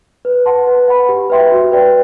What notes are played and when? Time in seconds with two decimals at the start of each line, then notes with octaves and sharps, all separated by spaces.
0.25 B4
0.46 F#5 A5 C6
0.67 B4
0.88 F#5 B5
1.09 G4
1.30 B4 E5 G5 C6
1.52 F#4
1.72 B4 D5 G5